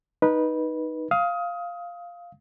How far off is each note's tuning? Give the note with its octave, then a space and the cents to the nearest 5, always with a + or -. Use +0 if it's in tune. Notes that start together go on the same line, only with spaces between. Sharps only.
D#4 +0 B4 -15
F5 +0 D#6 +25